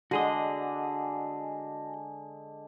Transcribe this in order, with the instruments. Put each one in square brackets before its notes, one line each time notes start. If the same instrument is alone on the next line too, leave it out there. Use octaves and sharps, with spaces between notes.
[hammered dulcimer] D3 G#3 [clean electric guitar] F#4 G#4 D#5